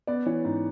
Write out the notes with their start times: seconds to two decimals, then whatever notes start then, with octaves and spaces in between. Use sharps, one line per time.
0.07 B3 D5
0.26 E3 C#5
0.45 G#2